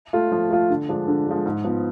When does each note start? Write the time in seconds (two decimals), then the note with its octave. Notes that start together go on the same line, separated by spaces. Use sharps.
0.13 A3 F4
0.32 F3
0.50 A3 F4
0.70 D3
0.89 F3 G#3 D4
1.08 D3
1.26 F3 G#3 D4
1.45 G#2
1.64 F3 B3